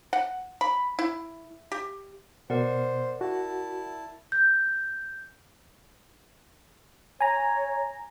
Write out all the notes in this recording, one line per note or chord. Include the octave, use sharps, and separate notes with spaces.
F#5
B5
E4
G4
B2 A#4 C5 D5 F#5
E4 F#4 A5
G6
C#5 G#5 A#5